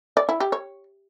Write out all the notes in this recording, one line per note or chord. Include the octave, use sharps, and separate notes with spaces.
D5
E4
G4
C#5